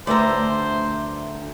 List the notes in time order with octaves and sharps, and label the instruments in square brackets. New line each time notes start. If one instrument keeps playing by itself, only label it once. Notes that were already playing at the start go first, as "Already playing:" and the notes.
[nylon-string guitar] D2 B4 E5 [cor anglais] C5 [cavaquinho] D5 A#5